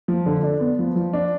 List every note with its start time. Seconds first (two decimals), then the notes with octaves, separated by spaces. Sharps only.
0.08 F3
0.26 D3
0.43 D4
0.60 B3
0.79 F3
0.96 F3
1.13 D4